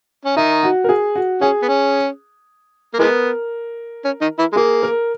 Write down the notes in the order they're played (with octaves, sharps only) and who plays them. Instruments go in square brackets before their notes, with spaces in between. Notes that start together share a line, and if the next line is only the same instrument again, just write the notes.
[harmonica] C#4
[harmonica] D#3 D#4 [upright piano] E5
[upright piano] F#4
A#4
G#4
F#4
[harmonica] C#4 [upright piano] G#4
[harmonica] B3
C#4
A#3
[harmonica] E3 G#3 B3 [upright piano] A#4
[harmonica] C#4
D#3 D#4
E3 E4
G#3
[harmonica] A#3 [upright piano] G#4
[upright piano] A#4